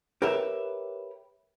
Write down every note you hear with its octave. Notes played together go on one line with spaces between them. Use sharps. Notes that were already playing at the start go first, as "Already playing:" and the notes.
G4 A#4 B4 C#5 E5